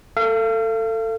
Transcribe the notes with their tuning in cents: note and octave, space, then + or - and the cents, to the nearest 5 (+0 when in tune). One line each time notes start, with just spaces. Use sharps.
A4 +25 F5 -35